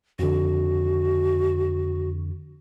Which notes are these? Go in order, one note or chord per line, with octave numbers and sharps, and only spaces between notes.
F2 D3 F#4